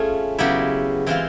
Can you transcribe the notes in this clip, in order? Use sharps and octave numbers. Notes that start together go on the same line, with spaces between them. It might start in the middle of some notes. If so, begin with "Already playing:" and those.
Already playing: A3 C#4 F4 G#4
C#3 F#3 B3 E4 G4
E3 G#3 C4 F4